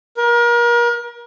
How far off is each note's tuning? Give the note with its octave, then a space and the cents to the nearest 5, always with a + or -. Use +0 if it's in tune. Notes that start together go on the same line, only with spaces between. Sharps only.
A#4 +35